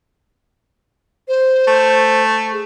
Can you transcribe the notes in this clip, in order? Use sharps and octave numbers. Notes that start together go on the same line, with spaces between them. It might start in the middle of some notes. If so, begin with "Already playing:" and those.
C5
A3
G#4